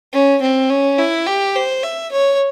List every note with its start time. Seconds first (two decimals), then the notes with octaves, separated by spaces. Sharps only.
0.13 C#4
0.42 C4
0.69 C#4
0.98 E4
1.27 G4
1.56 C5
1.83 E5
2.12 C#5